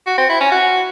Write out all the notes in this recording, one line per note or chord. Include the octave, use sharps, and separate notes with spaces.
F#4
C4
E4
C#4
F#4